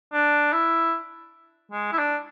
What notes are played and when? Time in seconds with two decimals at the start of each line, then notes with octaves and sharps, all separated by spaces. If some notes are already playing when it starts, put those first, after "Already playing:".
0.13 D4
0.53 E4
1.72 G#3
1.92 E4
1.98 D4